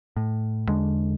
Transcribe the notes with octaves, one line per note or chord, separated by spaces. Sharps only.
A2
E2 D3 G#3 D4